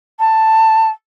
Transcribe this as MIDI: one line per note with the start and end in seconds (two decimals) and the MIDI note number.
0.19 0.88 81